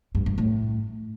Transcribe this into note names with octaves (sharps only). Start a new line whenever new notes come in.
G2
G2
A2